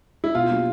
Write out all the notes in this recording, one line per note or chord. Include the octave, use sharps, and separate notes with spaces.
E4
B2 F4
F#3 A#3 D4 G4